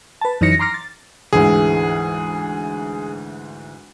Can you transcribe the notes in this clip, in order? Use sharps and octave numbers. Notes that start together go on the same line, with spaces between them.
B4 A5
F#2 E3 D#4 C#5 A#6 C#7
A#5 C6 D6 F6 A#6
A6
D2 G#2 E3 G#4